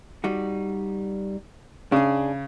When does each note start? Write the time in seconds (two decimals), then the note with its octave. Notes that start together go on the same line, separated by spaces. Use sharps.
0.24 G3 D#4 F#4
1.92 C#3 D4 G#4